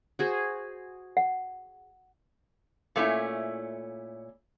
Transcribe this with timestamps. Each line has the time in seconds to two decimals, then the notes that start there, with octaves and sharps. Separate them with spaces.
0.19 F#4 G#4 C5
1.17 F#5
2.96 A#2 A3 C#4 E4